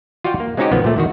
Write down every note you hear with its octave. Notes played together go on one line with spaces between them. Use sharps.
F4 F#4 D5 F5 G5
A#3
G#3 C4 C#4 D#4 F#4 G4
B1 D#3 F3 B3
A#2 A3
E2 D#3 F#4